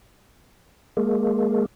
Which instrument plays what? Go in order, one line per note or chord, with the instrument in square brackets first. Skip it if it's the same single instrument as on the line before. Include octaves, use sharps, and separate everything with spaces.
[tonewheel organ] G#3 A#3